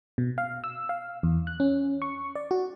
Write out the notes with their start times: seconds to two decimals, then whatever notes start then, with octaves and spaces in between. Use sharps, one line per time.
0.18 B2
0.38 F5
0.64 E6
0.89 F5
1.23 E2
1.47 F#6
1.60 C#4
2.02 C#6
2.35 D5
2.51 F#4